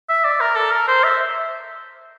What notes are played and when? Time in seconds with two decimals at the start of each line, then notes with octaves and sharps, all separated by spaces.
0.09 E5
0.24 D5
0.40 A#4
0.56 A4
0.71 A#4
0.88 C5
1.03 E5